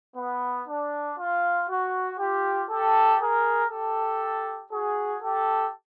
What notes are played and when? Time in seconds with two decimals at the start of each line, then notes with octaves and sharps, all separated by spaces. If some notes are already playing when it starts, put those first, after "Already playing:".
0.16 B3
0.68 D4
1.18 F4
1.69 F#4
2.19 F4 G4
2.70 G4 A4
3.20 G#4 A#4
3.70 G4 A4
4.71 F#4 G#4
5.22 G4 A4